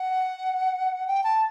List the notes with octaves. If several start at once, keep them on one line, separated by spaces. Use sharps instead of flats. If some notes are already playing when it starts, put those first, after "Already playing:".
Already playing: F#5
G5
A5